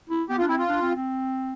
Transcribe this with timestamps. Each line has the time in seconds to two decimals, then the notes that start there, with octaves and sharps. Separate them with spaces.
0.09 E4
0.29 B3 G4
0.39 F4
0.42 D4
0.49 C4 E4
0.59 F4
0.69 D4
0.82 C4
0.96 C4